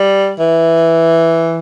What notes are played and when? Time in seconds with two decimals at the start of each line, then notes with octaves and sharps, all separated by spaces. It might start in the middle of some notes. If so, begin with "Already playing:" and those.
Already playing: G3
0.40 E3